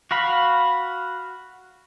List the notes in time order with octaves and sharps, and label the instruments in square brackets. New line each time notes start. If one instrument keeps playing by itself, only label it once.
[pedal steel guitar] F#4 F5 B5